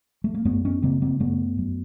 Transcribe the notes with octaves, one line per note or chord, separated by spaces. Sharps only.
A3
A#3
F#2 A3 B3
B3 C#4
C#3 A#3 C4
A#3 C4
F#2 A3 B3
F#2